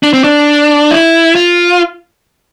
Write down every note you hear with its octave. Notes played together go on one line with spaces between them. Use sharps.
D4
C4
D4
E4
F4